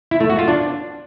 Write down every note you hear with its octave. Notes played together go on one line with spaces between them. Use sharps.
E4
A3
F#4
F4
D4